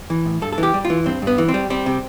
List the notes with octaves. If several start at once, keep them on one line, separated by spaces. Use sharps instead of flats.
E3
A2
G2 A4
A4
E3
G4
G3
F4
E3
G2 C4
G2 B3
E3
C4
G3
G3 C4
C3